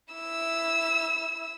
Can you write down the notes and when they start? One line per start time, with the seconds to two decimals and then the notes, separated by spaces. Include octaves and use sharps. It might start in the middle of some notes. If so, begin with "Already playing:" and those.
0.14 E4 E6